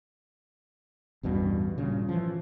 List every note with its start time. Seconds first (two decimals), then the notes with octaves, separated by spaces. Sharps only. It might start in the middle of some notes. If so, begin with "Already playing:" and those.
1.23 A1 E2 G2 B2
1.78 G2 A#2 C#3
2.09 E3 F3